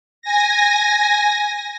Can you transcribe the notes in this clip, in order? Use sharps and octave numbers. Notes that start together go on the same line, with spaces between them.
G#5 A#6